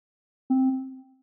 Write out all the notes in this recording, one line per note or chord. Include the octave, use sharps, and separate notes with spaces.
C4